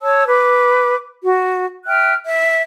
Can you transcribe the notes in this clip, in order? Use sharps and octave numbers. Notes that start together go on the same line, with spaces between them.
C#5 A5 E6
B4 D6
F#4
E5 G5 F6 F#6
E5